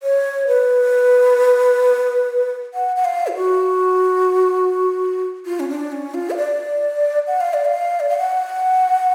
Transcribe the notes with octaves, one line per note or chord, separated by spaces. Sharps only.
C#5
B4
F#5
F#5
F5
F4
F#4
F4
C#4
D4
C#4
F4
F5
D5
F#5
F5
D5
F5
D5
F5
F#5